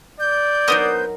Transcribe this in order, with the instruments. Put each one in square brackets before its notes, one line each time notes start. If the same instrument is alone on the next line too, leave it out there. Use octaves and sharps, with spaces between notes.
[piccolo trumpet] D5 [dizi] G6
[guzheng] F#3 D#4 A#4 [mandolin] B3 C5 D#6